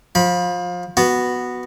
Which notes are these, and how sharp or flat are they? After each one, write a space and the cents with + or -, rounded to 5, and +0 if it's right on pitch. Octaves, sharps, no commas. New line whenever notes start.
F3 +25 B5 -20
B3 +0 F#4 +0